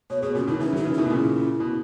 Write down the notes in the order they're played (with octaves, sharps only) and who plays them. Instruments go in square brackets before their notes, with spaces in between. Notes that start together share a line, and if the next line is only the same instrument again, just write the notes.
[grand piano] B2 [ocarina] C#5
[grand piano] B2 [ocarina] G#4
[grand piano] A#2 C#3 [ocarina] F#4
[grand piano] B2 D#3 [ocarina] E4
[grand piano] C#3 E3 [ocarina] D#4
[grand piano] D#3 F#3
[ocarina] D#4
[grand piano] C#3 E3
[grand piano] B2 D#3 [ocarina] E4
[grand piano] B2
A#2 C#3
B2